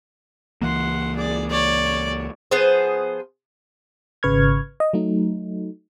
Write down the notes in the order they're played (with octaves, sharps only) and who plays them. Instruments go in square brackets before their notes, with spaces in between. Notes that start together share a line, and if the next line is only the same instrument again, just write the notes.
[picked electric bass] C#2 E3 A#3 [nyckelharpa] F#5 C6
[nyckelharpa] G#4 D5
[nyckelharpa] C#5 [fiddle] D5
[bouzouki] F3 B3 G#4 C5
[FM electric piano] G#1 C#3 B4 C#6 F6 G#6
D#5
F#3 A3 D#4